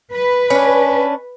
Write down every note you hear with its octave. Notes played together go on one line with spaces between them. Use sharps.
B4
C#4 D4